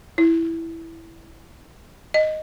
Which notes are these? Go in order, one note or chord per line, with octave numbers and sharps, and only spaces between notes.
E4
D#5